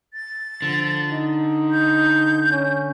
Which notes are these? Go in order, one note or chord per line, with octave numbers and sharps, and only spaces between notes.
A6
D3 F3
D#4
G6
C#4